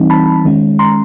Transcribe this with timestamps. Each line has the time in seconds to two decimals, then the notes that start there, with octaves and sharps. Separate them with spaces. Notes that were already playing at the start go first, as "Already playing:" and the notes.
Already playing: E3 G3 C4 D#4
0.10 A5 B5
0.45 D#3 G#3 C#4
0.79 A#5 C6